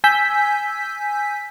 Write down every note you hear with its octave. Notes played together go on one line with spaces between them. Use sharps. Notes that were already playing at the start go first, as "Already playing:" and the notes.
G#5 E6 G6 B6